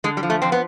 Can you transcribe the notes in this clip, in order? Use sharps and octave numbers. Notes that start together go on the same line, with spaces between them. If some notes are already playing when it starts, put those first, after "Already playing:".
D3 G#3
G3
F3
A3
F2 C4
B3